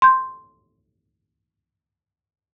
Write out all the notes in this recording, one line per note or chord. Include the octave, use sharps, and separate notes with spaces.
C6 G6